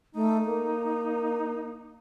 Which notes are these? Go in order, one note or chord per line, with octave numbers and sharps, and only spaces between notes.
A3 D#4
A#3